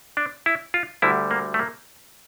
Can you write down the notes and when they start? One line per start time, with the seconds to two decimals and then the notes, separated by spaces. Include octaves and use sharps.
0.17 D4
0.46 E4
0.74 F4
1.02 D2 D3 G3 E4
1.31 A#3
1.54 A3
1.59 A#3